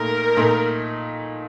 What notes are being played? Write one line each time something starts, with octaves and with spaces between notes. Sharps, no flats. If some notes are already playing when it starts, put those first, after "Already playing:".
Already playing: A#2 A3 D#4 A#4
A#2 A3 D#4